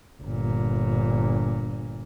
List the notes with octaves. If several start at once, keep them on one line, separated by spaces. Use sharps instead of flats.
G1 A#2